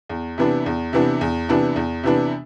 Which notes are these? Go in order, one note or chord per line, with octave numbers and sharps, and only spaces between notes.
E2
C3 E3 B3 D4
E2
C3 E3 B3 D4
E2
C3 E3 B3 D4
E2
C3 E3 B3 D4